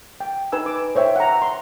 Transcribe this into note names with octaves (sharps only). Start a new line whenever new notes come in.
G5
D#4 B4 G#5 E6
D6
C5 C#5 E5 G5
F#5 A#5
C6